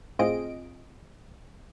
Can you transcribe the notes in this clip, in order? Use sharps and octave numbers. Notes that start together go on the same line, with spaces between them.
A2 C4 F4 G#4 D#5 D7